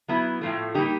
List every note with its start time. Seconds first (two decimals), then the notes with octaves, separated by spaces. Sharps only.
0.08 F#3 B3 E4
0.41 A2 F3 A3
0.74 G3 A#3 D#4 G4